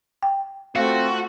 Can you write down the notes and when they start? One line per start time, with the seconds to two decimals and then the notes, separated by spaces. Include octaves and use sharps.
0.23 G5
0.76 A3 C4 F4 F#4 F5